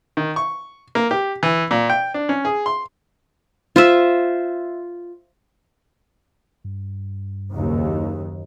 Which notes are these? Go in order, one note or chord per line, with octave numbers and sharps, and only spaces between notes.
D#3
C#6
A#3
G4
E3
A#2
G5
D4
C#4
G#4
C6
F4 C5 E5
G2
F#1 D#2 D#3